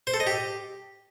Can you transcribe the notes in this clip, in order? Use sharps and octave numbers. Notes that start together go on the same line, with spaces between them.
C5
A4
D#5
G4